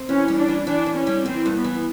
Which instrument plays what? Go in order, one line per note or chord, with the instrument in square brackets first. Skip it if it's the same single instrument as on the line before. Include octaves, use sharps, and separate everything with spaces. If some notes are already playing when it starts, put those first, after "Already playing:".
Already playing: [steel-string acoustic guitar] C4
[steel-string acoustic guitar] E3 [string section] C#4
[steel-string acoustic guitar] G3
[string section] D4
[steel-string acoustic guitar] E3
[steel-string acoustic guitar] E3 [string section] D4
[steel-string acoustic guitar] E3
[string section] C#4
[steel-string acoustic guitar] G3
[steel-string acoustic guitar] E3 [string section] C4
[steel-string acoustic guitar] G2
[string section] B3
[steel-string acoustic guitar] E3